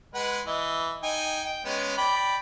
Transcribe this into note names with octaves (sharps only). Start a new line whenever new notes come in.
G#3 B4 F#5
E3 D#5
D#4 G5 G#5
G5
G#3 B3 C#4
D5 G5 B5